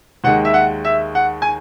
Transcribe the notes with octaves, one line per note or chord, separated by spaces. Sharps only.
D#2 D#3 G#3 F#5
E5
F#5
E5
F#5
G#5